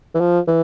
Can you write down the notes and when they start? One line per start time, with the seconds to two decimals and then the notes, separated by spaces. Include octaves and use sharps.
0.15 E3
0.20 F3
0.47 E3